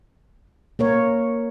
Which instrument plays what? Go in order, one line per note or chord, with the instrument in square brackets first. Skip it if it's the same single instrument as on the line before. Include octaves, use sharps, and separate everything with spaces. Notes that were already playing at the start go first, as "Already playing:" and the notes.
[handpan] A#3 A#4 C#5